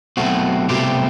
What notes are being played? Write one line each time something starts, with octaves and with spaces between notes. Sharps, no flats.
B1 B2 A3 C4 F#4
C2 B2 A3 C4 G4